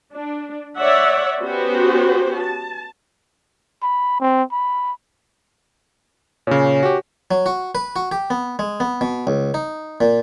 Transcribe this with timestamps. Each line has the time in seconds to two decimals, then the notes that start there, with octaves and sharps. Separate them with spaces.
0.14 D4
0.79 C#5 D5 E5 F#5
1.40 B3 C#4 F#4 G4 C5
2.39 A5
3.82 B5
4.20 C4
4.52 B5
6.47 A#2 C#3 C#4
6.83 F#4 G4
7.31 F#3
7.46 F#4
7.75 B4
7.96 F#4
8.12 G4
8.30 B3
8.59 G#3
8.80 B3
9.01 B2
9.27 C#2
9.54 D#4
10.01 A#2